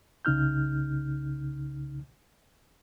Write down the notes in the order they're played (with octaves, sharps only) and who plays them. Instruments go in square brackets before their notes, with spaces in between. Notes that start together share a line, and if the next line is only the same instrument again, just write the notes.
[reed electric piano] C2 C#3 D#4 F6 G6